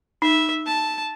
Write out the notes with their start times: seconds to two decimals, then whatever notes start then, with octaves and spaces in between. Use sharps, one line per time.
0.22 D#4 E5
0.66 A5